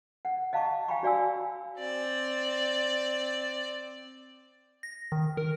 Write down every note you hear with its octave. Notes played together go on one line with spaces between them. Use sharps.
F#5
D#5 F5 A5 A#5 C#6 D6
F5 G5 G#5 A#5 B5 C#6
F#4 D5 F5 G#5 E6
C4 D5
A#6
D#3
A#4